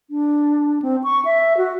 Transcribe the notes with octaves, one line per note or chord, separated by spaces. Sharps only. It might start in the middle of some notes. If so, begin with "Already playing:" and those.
D4
C4
C#6
E5
F#4